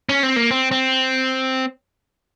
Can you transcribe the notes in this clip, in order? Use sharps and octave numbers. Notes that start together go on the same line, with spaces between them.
C#4
C4
A#3
C4
C4